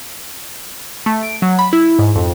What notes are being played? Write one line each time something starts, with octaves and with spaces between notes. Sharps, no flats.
A3
D7
F#3
B5
E4
G#2
F2